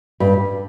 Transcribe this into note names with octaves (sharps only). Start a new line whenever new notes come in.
G2